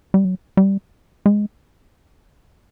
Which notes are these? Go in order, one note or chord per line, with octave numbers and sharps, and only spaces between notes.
G3
F#3
G3
G#3